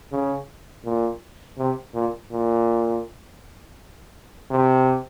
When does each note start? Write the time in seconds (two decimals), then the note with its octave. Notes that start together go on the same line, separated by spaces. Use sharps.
0.12 C#3
0.85 A#2
1.58 C3
1.94 A#2
2.32 A#2
4.51 C3